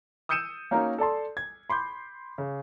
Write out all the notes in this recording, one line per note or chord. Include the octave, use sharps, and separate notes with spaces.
D#6 E6 G6 C#7 D#7 E7
A#3 C#4 D#4 F#4 A#4
A4 D5 A5 C6
G#6
B5 C6 D6 G6
C#3